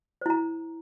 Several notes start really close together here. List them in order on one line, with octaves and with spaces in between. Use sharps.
C5 E4 A#5